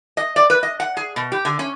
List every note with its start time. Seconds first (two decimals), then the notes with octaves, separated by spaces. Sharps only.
0.17 D#5
0.36 D5
0.50 B4
0.63 D#5
0.80 F#5
0.97 G#4
1.16 B2
1.32 G4
1.45 D3
1.59 C#4